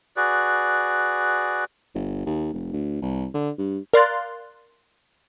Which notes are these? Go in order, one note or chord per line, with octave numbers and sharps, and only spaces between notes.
F#4 G#4 B4 D5
G1
D#2
F1
D2
C2
D3
G2
A#4 D5 F5 C6 F#6 A6